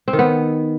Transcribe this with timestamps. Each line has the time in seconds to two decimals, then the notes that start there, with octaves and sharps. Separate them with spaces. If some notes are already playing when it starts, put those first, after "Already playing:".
0.08 C4
0.13 D#3
0.19 B3